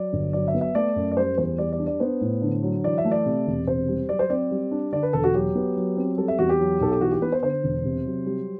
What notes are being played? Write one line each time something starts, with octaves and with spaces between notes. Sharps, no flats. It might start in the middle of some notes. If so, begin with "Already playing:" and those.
Already playing: F#3 D5
G1
F#3 D5
E5
B3
E5
A3 D5
F#2
D5
G3 C5
E2 C5
G3 D5
D5
D4
D5
B3 C5
A2
D3
F#3
E3 D5
E5
A3
D5
C3
E1
C3 C5
G3
F#3 D5
C5
C4 D5
G3
D4
D3 D5
B4
E1 A4
F#4
F#3 G4
B3
F#3
C4
G3 A4
E5
E2 F#4
G4
F#3
B1 A4
G4
E3 F#4
G4
B3 B4
C5
D3 C5
E1
C3
F#3
G3